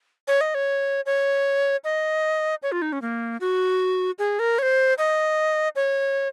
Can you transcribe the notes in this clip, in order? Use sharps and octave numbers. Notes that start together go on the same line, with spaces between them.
C#5
D#5
C#5
C#5
D#5
C#5
F4
D#4
C#4
A#3
F#4
G#4
A#4
C#5
C5
D#5
C#5